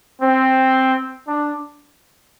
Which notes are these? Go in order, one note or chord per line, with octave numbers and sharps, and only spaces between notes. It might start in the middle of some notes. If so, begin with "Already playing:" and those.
C4
D4